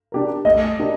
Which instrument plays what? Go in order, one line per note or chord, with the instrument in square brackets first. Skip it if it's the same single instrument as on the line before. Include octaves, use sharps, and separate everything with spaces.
[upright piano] D4 G4 A#4
[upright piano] A3 [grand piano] D#5
[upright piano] D4 G4 A#4